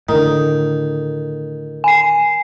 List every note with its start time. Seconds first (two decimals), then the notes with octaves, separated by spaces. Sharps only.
0.09 A2 D3 D#3
1.84 G#5 C7